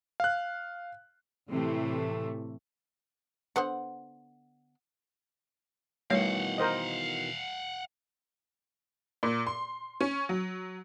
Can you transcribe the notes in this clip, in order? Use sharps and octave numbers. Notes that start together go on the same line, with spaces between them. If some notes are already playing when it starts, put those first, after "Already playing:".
F5 F#6
A2 C3 E3 A3
D3 B3 C5 F#5
B2 D#3 E3 G3 A3 C#5 F5 F#5
A#4 C5 D#5
A#2
C6
C#4
F#3